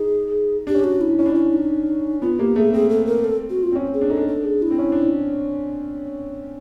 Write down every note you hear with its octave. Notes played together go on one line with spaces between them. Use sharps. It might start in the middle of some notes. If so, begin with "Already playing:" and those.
Already playing: D#4 G#4
D4 G4
C#4
D4 F#4
E4
C#4 E4
D4
C#4 E4
D#4
B3 F4
A#3 G4
A3 G#4
C4 G#4
A4
A#4
A4
F#4
F4
C4
C#4
G#4
D4
D#4 A4
D4
A4
G#4
E4
C4
C#4
D4